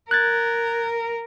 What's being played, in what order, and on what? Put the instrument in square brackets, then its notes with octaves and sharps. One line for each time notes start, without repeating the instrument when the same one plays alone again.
[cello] A#4 [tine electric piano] F#6 G#6 A6